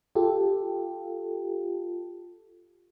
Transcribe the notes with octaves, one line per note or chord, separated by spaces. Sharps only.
F4 G4 A4